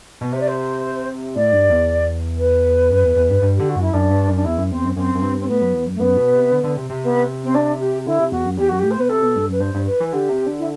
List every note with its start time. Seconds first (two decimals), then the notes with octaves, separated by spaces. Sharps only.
0.21 B2
0.32 C3 C5
0.40 D5
0.48 C5
1.36 A2 D5
1.52 G2
1.69 E2
2.38 B4
2.91 F#2
3.04 E2
3.16 E2
3.30 G2
3.42 G2
3.57 D3 G4
3.69 F#4
3.76 F#2
3.82 E4
3.93 F#2 D4
4.10 G2
4.28 F#2
4.37 D4
4.45 E2 E4
4.57 F#2
4.71 E2 C4
4.84 F#2
4.96 F#2 C4
5.15 F#2
5.22 G2
5.40 C4
5.48 A2 B3
5.61 F#2
5.73 E2
5.86 F#2
5.95 A3
6.00 F#2 B3
6.17 B2
6.34 C3
6.51 D3
6.64 D3
6.77 C3
6.90 C3
7.03 B3
7.44 C4
7.55 D4
7.80 G4
8.06 D3 E4
8.19 C3
8.32 E2 F#4
8.45 F#2
8.57 E2 G4
8.69 F#2 F#4
8.79 A2 G4
8.91 C5
8.97 B2 B4
9.09 C3 A4
9.22 B2
9.36 G2
9.48 F#2 B4
9.60 G2 C5
9.74 G2
9.86 B4
10.00 E3
10.12 D3 G4
10.29 C3
10.46 D3
10.59 E4